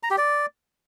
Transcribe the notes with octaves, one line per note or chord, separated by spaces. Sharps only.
A#5
G4
D5